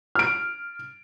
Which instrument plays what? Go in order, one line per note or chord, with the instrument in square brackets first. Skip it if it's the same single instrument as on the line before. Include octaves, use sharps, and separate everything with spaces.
[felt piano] F6 D7